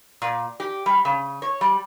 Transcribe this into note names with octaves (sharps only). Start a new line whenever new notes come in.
A#2
G4
G3
C#3
C#5
G3